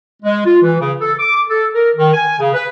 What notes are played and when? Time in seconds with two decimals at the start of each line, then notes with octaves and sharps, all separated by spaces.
0.23 G#3
0.44 F4
0.63 E3
0.79 C#3
1.00 A4
1.19 D6
1.48 A4
1.73 A#4
1.96 D#3
2.13 G#5
2.39 C#3
2.53 B4